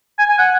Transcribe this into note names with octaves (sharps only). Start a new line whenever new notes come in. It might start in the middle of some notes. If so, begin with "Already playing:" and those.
G#5
G#5
F#5